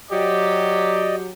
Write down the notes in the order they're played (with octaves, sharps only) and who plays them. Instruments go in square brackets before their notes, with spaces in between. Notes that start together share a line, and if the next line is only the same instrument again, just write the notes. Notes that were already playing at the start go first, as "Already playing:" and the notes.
[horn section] F#3 G4 [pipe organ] D5 D#5